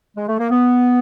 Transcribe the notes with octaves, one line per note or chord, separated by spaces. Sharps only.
G#3
A3
A#3
B3